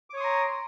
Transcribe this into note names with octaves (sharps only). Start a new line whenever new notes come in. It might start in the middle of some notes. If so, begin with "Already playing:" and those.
C#5 A#5 C6 D6 D#6